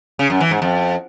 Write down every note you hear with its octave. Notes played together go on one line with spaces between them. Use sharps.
C#3
F#2
E3
G#2
F2